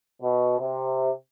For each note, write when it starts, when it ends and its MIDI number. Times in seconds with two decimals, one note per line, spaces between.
0.21 0.55 47
0.59 1.09 48